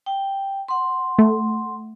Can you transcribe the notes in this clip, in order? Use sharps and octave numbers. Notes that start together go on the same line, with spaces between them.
G5
F#5 C6
A3